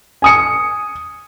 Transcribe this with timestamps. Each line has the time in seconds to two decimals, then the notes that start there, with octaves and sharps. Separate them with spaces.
0.22 G#5 D#6 C#7